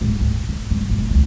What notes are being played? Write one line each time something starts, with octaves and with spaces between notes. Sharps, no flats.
D#1 G#2
D2
C3
G#2 G3
F#1 B1
D2 E3